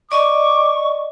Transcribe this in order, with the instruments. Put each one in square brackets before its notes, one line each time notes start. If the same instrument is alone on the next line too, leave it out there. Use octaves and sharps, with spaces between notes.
[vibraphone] D5 D#5 [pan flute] C#6 [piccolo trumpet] D6